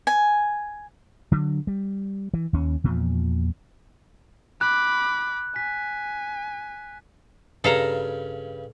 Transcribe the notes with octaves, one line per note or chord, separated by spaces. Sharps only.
G#5
D3 F#3
G3
E3
D#2 C#4
E2 A#2 F3
B5 D6 F#6
G#5 B6
G2 C#3 A4 F5 A#5